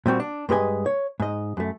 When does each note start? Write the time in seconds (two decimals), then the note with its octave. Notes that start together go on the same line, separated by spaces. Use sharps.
0.06 A#2 G3 C4 F#4
0.20 D4
0.49 G2 G#3 B4 D#5 G#5
0.86 C#5
1.20 G#2 D#5
1.57 F#2 A3